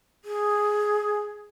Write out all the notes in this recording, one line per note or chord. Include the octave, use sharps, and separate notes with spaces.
G#4